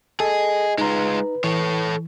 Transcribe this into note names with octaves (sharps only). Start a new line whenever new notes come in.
G#4 A4 D#5
G#3 D#4 F4 B4 A#5
E3 A4 C#5